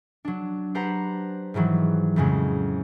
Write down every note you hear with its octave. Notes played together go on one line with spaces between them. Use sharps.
F#3 D4
D4 G4 B4 C5 F#5 A#5
G#2 D#3 E3 F#3 G3
F2 A2 C#3 F#3 G#3